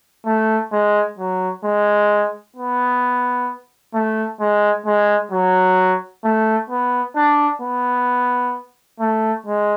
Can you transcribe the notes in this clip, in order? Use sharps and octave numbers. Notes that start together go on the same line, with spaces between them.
A3
G#3
F#3
G#3
B3
A3
G#3
G#3
F#3
A3
B3
D4
B3
A3
G#3